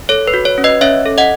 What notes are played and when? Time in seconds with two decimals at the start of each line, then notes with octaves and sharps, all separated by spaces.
0.09 A4 C#5
0.27 B4
0.34 F#4
0.45 C#5
0.58 C#4
0.64 B4 D#5
0.81 C#4 C#5 E5
1.06 A4
1.18 D#5 F#5